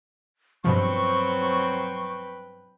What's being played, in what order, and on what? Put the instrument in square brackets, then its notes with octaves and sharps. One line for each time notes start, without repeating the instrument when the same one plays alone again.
[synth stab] G2 B2 F3 [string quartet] F#3 C4 [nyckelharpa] B4 G5 [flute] C#6